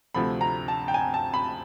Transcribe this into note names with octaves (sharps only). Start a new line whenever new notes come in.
D2 C3 F3 A3 B5
A#5
A5
G5
G#5
A5
B5